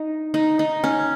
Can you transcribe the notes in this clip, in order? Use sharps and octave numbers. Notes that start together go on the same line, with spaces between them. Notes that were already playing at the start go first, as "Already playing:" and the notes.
Already playing: D#4
D#4
D#4
C#4